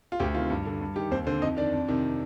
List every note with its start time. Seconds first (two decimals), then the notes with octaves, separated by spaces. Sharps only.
0.12 F4
0.20 D2 G4
0.35 C3 D#3 F4
0.50 G2
0.66 D3
0.81 G2
0.96 D#3 G4
1.11 D#2 C4 C5
1.26 D3 C4 C5
1.42 F2 D#4 D#5
1.57 D#3 D4 D5
1.73 F2
1.88 C3 D#3